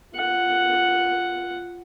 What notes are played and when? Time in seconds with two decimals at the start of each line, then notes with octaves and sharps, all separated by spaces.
0.16 F4 F#5